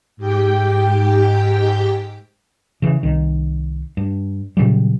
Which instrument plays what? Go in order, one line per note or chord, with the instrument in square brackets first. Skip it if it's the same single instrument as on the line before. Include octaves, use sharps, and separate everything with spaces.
[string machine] G#2 G4 G5
[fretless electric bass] C#3 E3
C2 D#3
G2
A#2 C#3 F#3 G3